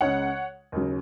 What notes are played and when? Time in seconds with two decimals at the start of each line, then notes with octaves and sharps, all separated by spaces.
0.01 C#2 C#3 G#3 C#5 F#5
0.72 D#2 C#3 F#3